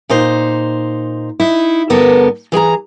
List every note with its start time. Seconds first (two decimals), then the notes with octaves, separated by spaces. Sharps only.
0.09 A#2 D#4 C5
1.40 D#4 E4
1.90 G2 D3 B3 A4 A#4
2.52 E3 G#4 G5 A#5